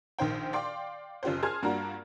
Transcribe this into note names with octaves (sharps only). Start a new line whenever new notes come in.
A#1 D#3 C5 G5
D5 F5 G5 C6 D6
F#1 C#4 F4 G4 C5
G#4 G#5 A5 C6 F6 G#6
G2 A#3 D4 F4 F#4 A#5